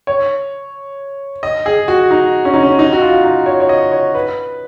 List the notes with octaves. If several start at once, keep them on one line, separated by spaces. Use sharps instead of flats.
C#5
D#5
G#4
F#4
D#4
C#4
D#4
C#4
D#4
F#4
F4
D#4
C#5
C#5
D#5
C#5
B4